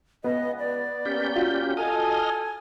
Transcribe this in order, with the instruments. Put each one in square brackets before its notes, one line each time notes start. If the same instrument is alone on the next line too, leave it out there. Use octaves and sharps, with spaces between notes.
[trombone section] C#2 [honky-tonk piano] B3 [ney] D#5
[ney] D5
[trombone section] A#3 [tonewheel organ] C#4 G4 G6
[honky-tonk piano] F4 F#4
[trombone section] A4 [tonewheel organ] D#5 D#6 F6 [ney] G#5